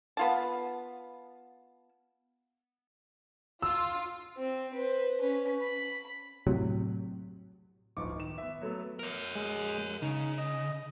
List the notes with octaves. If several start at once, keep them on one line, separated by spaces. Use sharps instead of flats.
B3 F4 A5
F4 E6
C4
B4 C5
C#4 B4
B5
A2 C3 F#3
D1 G1 F3 D#4 C#6 D6
D#3 E7
B3 E5
F#3 A3 B3
A#4 C#5
G#3
C#3 D#4
D#5